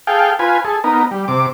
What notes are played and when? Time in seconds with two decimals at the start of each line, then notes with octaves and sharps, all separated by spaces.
0.07 G#4 A4 F5 G5
0.39 F4 B4 G#5
0.65 G#4 A4
0.84 B3 D#4 A#4
1.11 G3
1.28 C3 D6